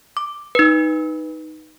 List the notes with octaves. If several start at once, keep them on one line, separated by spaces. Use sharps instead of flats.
D6
D#4 B4